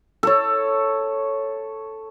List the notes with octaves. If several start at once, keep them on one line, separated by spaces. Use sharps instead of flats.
A4 C#5